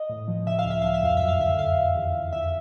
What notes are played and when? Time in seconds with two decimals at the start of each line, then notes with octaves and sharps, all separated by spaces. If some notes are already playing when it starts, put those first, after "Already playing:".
Already playing: D#5
0.10 A2
0.28 F3
0.46 C#3 E5
0.59 F5
0.64 C#2
0.71 E5
0.82 F3 F5
0.94 E5
1.03 F2 F5
1.17 F#2 E5
1.28 F5
1.39 D3 E5
1.58 F2 F5
1.77 F2
1.95 E2
2.14 E2
2.33 F2 E5